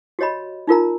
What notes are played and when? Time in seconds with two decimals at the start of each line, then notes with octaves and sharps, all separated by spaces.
0.19 F#4 G4 C#5 D#5 B5
0.67 D#4 F4 A#4 A#5